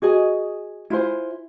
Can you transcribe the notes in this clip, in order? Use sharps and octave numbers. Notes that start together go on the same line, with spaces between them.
F#4 G#4 D#5 G#5
E4 F4 C5 G#5